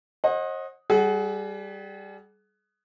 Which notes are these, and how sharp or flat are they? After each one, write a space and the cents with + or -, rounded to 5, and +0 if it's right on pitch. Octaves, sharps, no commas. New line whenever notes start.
C5 +45 D#5 +5 F#5 -10
G3 +0 G#4 +35 F#5 +15